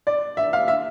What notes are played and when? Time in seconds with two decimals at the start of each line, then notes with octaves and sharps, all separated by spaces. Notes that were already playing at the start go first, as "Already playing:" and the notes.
0.07 D5
0.37 E5
0.53 F5
0.68 E5